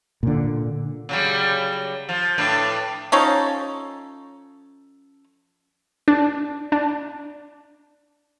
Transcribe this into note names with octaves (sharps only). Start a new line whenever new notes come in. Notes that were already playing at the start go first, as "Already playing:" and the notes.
A#2 D3
C#3 F#3 G3
F3
A2 D4 B4
F3 C#4 D#4 A4
D4
D4